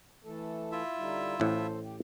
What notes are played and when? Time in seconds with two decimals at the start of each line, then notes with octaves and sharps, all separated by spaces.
0.25 E3 A3 A4
0.72 E4 F4 E5
0.97 D3 G3 D#4
1.40 A1 A2 A4 C5
1.83 G4